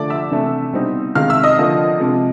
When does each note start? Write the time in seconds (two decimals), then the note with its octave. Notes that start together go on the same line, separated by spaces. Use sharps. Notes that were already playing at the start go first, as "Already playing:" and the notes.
Already playing: D3 F3 A3 D5 D6
0.10 E5 E6
0.31 C3 E3 A3 D4
0.73 B2 G3 C4 D#4
1.15 C3 D#3 G#3 F5 F6
1.30 E5 E6
1.43 D#5 D#6
1.58 D3 F3 A#3
2.00 C3 F3 G#3